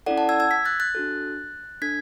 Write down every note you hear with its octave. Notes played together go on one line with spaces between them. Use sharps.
C#4 E4 A4 D5 F#5
F#5 A5
E6 G#6
E6 G#6
G#6 B6
F#6 A6
F#6 A6
D4 F#4 A4
D4 A4 G#6 B6